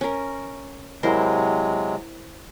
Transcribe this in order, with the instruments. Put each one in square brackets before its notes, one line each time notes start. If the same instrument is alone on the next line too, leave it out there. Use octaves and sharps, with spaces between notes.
[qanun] C#4 A#4
[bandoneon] C3 F#3 G#3 [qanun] E4 A#4 C5